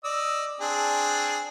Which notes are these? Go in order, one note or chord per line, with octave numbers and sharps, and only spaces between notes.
D5 D#5 E6
C4 D4 G#4